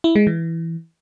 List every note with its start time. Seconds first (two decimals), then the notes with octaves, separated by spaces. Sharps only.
0.04 E4
0.16 G#3
0.27 E3